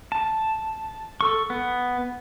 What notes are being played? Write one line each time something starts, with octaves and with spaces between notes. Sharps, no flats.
A5
A4 C#6
B3